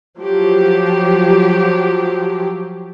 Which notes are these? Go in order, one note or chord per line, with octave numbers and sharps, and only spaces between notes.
F3 F#3 G4